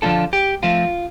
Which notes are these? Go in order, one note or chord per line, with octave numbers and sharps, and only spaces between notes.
D3 F3 A#3 D4 F4 A4
G4
F3 A3 C4 F4